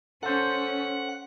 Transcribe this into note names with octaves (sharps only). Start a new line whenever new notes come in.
C#4 A4 C5 F#5